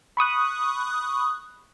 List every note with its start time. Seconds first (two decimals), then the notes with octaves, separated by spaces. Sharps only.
0.17 B5 C#6 D#6 F#6